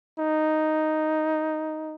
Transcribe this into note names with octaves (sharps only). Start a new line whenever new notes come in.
D#4